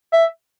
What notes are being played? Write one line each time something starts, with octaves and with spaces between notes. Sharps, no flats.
E5